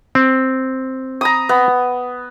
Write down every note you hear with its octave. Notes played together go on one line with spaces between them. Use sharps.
C4
A#5 B5 D#6
B3